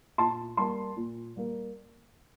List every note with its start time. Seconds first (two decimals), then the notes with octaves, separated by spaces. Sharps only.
0.18 A#2 A5 C6
0.57 G3 A#3 A5 C6
0.97 A#2
1.36 G3 A#3